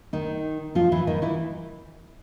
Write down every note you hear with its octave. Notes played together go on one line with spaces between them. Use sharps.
D#3 D#4
F3 F4
E3 E4
D#3 D#4
E3 E4